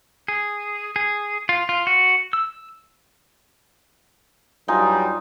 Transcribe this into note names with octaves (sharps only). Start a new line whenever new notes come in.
G#4
G#4
F4
F4
F#4
E6
G2 F#3 G3 D#4 F4 G#5